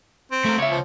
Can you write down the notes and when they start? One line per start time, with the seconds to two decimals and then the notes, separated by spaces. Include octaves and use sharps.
0.32 C4
0.45 A3 A#4
0.58 C#2 A#3 C#5 E5
0.71 F3